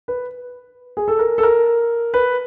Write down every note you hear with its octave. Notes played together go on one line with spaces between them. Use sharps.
B4
G#4
A4
A#4
A4
A#4
B4